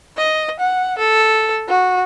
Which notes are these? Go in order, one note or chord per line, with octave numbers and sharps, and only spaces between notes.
D#5
F#5
A4
F#4